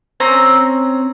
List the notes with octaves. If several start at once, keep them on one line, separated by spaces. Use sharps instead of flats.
C4 C#4 A#5